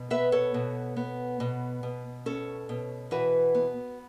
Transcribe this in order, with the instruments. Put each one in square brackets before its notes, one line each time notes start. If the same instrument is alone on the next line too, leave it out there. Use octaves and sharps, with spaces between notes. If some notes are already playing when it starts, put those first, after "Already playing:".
Already playing: [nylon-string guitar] B2
B3 B4 E5
A4 C#5
B2
B3
B2
B2
C#4 A4 C#5
B2
E3 F#4 B4
B3